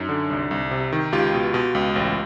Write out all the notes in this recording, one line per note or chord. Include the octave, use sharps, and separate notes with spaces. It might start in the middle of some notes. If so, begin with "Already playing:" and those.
Already playing: F#2 D#4
D3
C2
C2
C3
D#3
C#2 F4 G4
B2
B2
C#2
A1